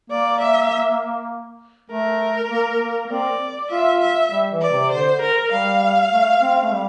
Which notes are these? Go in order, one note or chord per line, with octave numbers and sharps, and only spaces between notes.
A#3 D5
E5
A3 A#4
A#3
A#3
A#3
C4 D5
F4 E5
E5
G3
E3
D5
C3
D3 C5
A#4
G3 F5
A3
C4
A3
G3